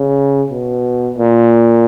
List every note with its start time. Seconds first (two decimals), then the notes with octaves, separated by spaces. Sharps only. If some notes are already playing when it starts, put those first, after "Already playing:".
Already playing: C#3
0.50 B2
1.18 A#2